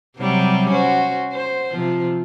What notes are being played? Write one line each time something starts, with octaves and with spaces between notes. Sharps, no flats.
C3 F#3 G3
C#4 F#4 C5
C5
C3 F3